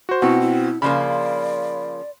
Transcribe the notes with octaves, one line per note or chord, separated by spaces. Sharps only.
F#4 C5
B2 C4 E4 F#4
E4
C#3 F3 A#3 D5 B5 C6